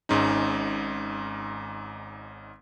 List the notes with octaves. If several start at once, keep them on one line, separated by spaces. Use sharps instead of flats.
G#1 G#2 C#4 D#4